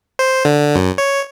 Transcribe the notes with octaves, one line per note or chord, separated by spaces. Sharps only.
C5
D3
F#2
C#5